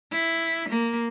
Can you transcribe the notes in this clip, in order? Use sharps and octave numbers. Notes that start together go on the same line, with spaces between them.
E4
A#3